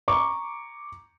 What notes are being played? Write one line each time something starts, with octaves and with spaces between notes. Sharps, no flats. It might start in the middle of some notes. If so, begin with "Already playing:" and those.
A#5 C#6 D6